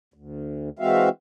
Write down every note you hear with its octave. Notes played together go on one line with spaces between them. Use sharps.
D2
E3 G#3 C4 F#4 E5 F5